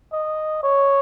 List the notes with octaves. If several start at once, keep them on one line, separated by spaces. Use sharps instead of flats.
D#5
C#5